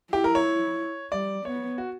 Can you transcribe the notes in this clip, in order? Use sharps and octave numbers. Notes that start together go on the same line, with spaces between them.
E4 G4
A#4
C#5
G3 D5
B3 C#5
F#4